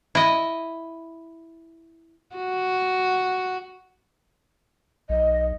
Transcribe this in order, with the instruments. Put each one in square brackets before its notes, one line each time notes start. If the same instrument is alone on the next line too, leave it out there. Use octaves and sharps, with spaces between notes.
[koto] E4 D#5
[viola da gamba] F#4
[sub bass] B1 [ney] D#5